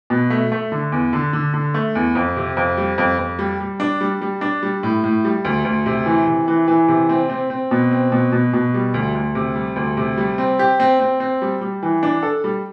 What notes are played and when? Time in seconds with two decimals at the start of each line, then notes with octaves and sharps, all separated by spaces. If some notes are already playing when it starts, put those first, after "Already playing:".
0.10 B2
0.30 A3
0.52 A3
0.72 D3
0.92 E2
1.13 D3
1.33 D3
1.54 D3
1.74 A3
1.95 E2
2.15 F2
2.36 C3
2.57 F2
2.77 G3
2.98 F2
3.19 F2
3.39 G3
3.60 G3
3.80 D4
4.01 G3
4.21 G3
4.41 D4
4.63 G3
4.83 A2
5.04 A2
5.24 G3
5.45 D2
5.65 D2
5.86 C3
6.06 E3
6.27 C3
6.48 E3
6.68 E3
6.88 C3
7.09 C4
7.30 C4
7.50 C4
7.71 B2
7.91 C4
8.12 B2
8.32 B2
8.53 B2
8.74 G3
8.94 D2
9.15 D2
9.35 C3
9.56 G3
9.76 D2
9.97 C3
10.18 G3
10.38 C4
10.59 G4
10.80 C4
11.00 C4
11.20 C4
11.42 G3
11.61 G3
11.83 E3
12.03 D4
12.23 A4
12.44 G3